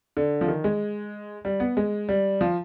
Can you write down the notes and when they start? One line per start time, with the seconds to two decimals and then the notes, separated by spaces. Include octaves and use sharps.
0.17 D3
0.41 F3
0.48 D#3
0.64 G#3
1.45 G3
1.60 B3
1.77 G#3
2.09 G3
2.41 F3